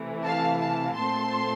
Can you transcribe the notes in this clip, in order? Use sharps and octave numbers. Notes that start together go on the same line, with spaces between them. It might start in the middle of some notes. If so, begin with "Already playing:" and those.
Already playing: C3 E3 A3
F5 A5
F5 A5
A#2 A3 C4 A5 C6